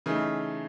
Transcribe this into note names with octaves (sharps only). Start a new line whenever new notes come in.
C#3 E3 A3 D#4